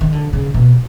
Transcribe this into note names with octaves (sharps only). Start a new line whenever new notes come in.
D#3
D3
C#3
B2